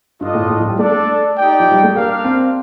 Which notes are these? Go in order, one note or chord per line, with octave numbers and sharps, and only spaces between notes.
G2 D4 F4 A4 D#5
A2
A2
F3
G3
A3 D4 A4 D5
D#4 G4 D5 G5
F3
G3
A3
A#3 D4 G4 A#4 F5
C4